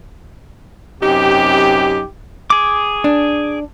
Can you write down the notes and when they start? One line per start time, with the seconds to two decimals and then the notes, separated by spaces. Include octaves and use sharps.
1.01 F#2 C3 D#4 G4
2.50 G#4 D6
3.04 D4